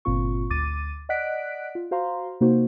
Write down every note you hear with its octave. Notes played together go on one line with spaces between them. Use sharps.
G1 A#2 C4 F4 C#6
D2 D6 A6 D#7
D5 D#5 F#5 F#6 B6 D7
F4
F#4 C5 F5 A#5 C6
C3 A#3 D#4 F#4 C5